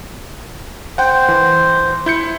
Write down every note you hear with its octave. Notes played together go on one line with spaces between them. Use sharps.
C5 F#5 G5
E3
E4 G6 C#7